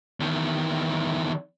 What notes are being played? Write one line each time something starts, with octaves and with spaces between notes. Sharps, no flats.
E2 D#3